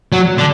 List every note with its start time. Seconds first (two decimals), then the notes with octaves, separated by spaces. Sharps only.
0.12 F#3
0.38 D3